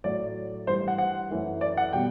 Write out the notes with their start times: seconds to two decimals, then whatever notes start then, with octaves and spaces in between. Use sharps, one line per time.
0.04 A2 F#3 A3 D5
0.67 G2 E3 G3 C5
0.88 F#5
0.98 F#5
1.30 F#2 E3 A3
1.61 D5
1.77 F#5
1.93 B2 G3 G5